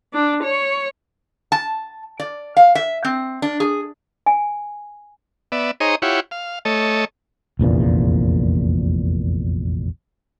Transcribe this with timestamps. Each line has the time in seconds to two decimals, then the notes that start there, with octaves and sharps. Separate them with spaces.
0.13 D4
0.43 C#5
1.52 A5
2.20 D5
2.57 F5
2.75 E5
3.05 C4
3.42 D4
3.60 G#4
4.26 G#5
5.52 B3 D5 E5
5.80 D#4 G#4 C5 C#5 D#5 A#5
6.02 E4 F4 G4 C#5 F#5
6.31 F5
6.65 A3 A4 C#5 D#5
7.59 F1 A#1 E2 A#2